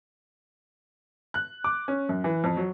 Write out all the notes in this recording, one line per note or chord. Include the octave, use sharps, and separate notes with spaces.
F#6
D6
C#4
F#2
E3
F2
F#3